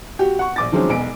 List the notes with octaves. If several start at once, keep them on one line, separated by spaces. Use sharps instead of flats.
F#4 G4
F#5 C#6
A#1 D6 A6
D#3 F3 F#3 G#3 C4 C#4
E1 B1 G#5 D7